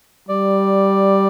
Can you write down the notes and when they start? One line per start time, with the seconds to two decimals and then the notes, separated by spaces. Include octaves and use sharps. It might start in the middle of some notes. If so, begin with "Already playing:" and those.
0.29 G3 D5